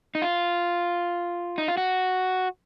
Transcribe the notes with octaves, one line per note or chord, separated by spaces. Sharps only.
D#4
F4
D#4
F4
F#4